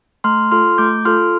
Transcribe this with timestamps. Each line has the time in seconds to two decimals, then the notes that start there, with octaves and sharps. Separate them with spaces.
0.24 A3 C6 F6
0.51 F4 A4 C6 F6
0.78 A3 D6 G6
1.05 F4 A4 C6 F6